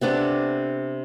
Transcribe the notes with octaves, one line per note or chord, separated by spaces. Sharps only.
C3 B3 D4 A4